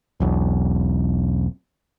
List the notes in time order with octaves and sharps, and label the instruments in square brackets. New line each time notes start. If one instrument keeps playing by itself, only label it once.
[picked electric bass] E1 B1